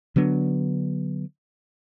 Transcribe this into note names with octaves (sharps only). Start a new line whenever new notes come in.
D3 F#3 B3 D4